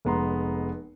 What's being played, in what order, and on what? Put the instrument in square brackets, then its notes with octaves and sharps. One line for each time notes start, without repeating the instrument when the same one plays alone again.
[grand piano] F1 G#3 B3 A#5 C6